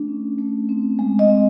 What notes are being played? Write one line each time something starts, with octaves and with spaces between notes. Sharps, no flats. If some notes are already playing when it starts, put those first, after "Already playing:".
Already playing: A3 D4
C#4
A3
C4
G#3
D#5
C4